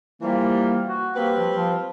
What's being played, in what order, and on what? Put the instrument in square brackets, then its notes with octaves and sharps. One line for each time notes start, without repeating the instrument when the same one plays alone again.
[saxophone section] E3 F3 G3 [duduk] A#3
[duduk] F#4
[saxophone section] G3 C4 B4 [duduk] A#3
[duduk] F3
F3